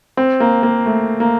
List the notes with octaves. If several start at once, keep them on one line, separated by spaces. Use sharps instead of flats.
C4
A#3
A#3
A3
A#3